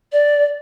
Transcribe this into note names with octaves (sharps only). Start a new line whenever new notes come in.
D5